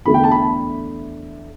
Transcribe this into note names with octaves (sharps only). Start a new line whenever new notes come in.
E2 D3 A3 D4 B5
G5
A5
B5